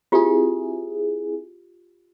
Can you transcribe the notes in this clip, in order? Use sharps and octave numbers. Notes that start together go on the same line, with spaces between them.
C4 E4 F4 G4 G#4